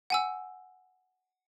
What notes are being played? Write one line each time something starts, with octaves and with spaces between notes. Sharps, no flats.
F#5 G#5 E6